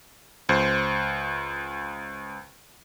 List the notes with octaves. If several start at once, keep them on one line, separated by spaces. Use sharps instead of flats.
C#2 C5